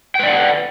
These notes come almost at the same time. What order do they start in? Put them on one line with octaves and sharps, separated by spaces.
G5 B4 D5 F#5